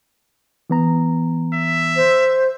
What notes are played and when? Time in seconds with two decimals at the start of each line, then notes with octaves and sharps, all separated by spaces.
0.70 E3 B3 A#5
1.54 E5
1.96 C5